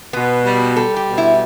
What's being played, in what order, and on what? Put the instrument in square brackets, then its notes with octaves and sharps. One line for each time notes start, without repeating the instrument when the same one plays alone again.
[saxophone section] B2 [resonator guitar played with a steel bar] B3
[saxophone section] G3
[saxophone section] G3 [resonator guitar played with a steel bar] A4
[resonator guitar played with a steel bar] G4
[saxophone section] B2
[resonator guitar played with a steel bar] E4